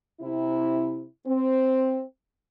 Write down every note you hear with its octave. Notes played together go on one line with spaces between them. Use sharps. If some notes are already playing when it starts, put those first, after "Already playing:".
C3 E4
C4